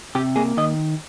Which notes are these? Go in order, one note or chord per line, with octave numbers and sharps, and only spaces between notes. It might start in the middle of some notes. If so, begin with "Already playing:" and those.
C3 G4
A#3 G#4
D#3 D#5